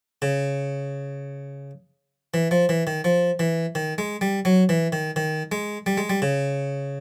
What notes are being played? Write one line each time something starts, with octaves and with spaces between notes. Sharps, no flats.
C#3
E3
F3
E3
D#3
F3
E3
D#3
G#3
G3
F#3
E3
D#3
D#3
G#3
G3
G#3
G3
C#3